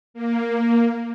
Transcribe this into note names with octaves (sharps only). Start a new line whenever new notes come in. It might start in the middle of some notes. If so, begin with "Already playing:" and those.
A#3